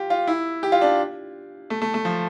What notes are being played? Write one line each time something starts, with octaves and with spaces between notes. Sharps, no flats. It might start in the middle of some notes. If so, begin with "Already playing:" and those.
Already playing: F4 G4
F4
E4
G4
F4
D4
A3
A3
A3
F3